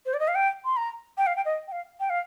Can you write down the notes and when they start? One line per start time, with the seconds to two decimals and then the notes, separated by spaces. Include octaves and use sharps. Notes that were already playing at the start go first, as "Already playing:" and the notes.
0.06 C5
0.14 D5
0.20 D#5
0.28 F5
0.35 G5
0.65 C6
0.77 A#5
1.18 G5
1.27 F5
1.36 G5
1.45 D#5
1.68 G5
1.72 F5
2.00 G5
2.10 F5